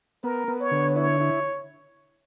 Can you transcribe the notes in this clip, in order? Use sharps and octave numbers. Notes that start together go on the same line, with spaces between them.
B3 A#4
B3
C#5
D3
E4 C#5
E4